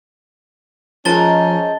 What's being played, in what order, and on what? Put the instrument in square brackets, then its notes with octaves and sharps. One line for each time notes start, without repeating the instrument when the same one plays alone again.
[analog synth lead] F3 [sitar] G#3 A#4 C5 [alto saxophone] C#4 [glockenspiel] A5 A6 G7